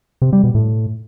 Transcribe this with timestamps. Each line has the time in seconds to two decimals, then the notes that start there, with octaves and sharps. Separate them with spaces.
0.22 C3
0.33 G3
0.44 B2
0.55 A2